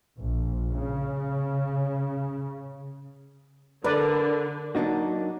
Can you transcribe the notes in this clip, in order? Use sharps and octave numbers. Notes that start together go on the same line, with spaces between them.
A#1
C#3
D3 A#4 B4 D5
F#3 A#3 D4 D#4 F#4